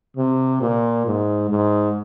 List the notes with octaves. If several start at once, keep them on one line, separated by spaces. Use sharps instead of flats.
C3
A#2
G#2
G#2